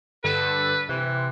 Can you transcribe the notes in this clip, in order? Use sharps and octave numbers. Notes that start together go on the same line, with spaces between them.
G2 D3 A4 B4
C3 E3